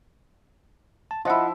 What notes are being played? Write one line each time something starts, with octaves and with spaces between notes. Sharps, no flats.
A5
F3 E4 F4 D#5 F#5